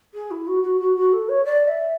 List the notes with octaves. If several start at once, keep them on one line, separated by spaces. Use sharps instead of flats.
G#4
E4
F#4
F#4
F#4
F#4
A4
C#5
D5
E5